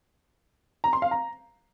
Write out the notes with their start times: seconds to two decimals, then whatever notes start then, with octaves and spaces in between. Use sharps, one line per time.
0.84 A#5
0.93 C6
1.02 F5
1.11 A#5